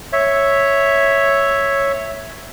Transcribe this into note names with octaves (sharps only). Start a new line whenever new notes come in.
C#5 E5